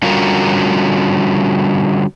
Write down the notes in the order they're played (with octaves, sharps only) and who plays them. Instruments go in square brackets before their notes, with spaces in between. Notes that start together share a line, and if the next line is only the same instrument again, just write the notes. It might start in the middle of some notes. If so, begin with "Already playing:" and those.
[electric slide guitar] D3 G3 C#4 F4 F#4 A#4